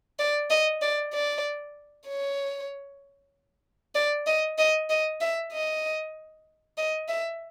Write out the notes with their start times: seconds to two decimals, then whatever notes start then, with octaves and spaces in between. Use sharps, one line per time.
0.19 D5
0.50 D#5
0.82 D5
1.13 D5
2.07 C#5
3.95 D5
4.26 D#5
4.58 D#5
4.90 D#5
5.21 E5
5.53 D#5
6.78 D#5
7.08 E5